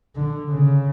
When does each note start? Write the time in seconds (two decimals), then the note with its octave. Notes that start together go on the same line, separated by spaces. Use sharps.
0.16 D3
0.50 C#3